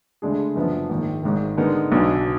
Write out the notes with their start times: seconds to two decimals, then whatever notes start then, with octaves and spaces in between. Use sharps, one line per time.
0.22 D2 D3 G#3 D4 G#4
0.56 F#1 F#2 F3 B3 D4
0.89 A#1 G#2 D#3
1.23 G#1 G#2 D#3
1.57 D3 G#3 B3 D#4 A#4
1.92 B1 B2 F#3 D4